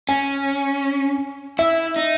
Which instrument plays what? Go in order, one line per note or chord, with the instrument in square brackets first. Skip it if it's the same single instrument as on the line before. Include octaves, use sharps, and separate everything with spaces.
[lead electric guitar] C#4 [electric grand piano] G#5
[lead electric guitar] E4 [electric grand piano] E5
[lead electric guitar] D#4